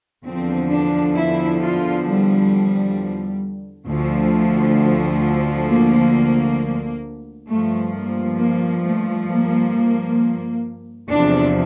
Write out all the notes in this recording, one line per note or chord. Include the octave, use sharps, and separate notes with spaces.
E2 D3 F3 C4
D4
E4
F4
G3
D2 D3 F3 A3
A#3
G2 F3 A3
A#3
A#3
A3
A#3
E2 C3 F3 D4